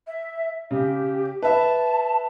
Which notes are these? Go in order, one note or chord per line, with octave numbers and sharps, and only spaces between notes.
E5
C#3 G4
B4 E5 A5